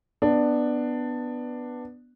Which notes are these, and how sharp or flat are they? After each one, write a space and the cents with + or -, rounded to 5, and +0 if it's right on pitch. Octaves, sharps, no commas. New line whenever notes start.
B3 +0 D4 +10